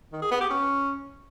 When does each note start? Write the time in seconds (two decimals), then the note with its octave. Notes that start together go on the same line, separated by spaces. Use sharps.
0.12 D#3
0.22 G#4
0.31 B3
0.41 G4
0.50 C#4